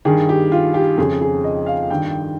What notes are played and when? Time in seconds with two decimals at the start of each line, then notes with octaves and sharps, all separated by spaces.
0.05 G2 D#3 G#4
0.29 G4
0.52 F4
0.74 G4
0.98 F2 C#3 G#4
1.21 G#4
1.44 D#5
1.66 F5
1.90 G2 D#3 G5